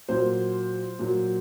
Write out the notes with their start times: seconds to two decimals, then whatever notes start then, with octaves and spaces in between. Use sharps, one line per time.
0.09 A#2 F#3 C5
0.99 A#2 F#3